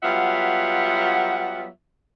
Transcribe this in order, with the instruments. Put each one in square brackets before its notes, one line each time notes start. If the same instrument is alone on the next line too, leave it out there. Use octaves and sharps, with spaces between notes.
[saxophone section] F#3 G3 B3 F4 E5 F#5